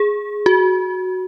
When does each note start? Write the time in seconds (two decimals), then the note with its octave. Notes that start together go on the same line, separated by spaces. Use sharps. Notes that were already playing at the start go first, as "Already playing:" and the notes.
Already playing: G#4
0.46 F#4